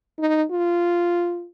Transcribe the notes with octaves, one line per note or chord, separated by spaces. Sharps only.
D#4
F4